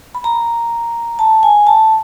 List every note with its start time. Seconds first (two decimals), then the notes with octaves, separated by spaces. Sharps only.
0.15 B5
0.24 A#5
1.19 A5
1.43 G#5
1.67 A5